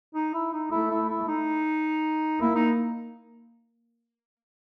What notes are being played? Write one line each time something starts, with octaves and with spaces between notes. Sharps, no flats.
D#4
E4
D#4
A3 E4
E4
E4
D#4
A#3 E4
D#4